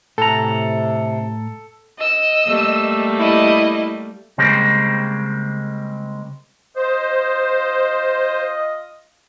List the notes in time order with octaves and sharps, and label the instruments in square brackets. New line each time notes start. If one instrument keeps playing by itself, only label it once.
[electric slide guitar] A2 A#5 [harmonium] C3 [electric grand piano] A4
[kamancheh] D#5 E6
[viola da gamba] G3 A3 A#3
[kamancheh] E4 D#5
[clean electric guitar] C#3 G3 G#3 A#3 C4
[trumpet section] F4 D#5 [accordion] C5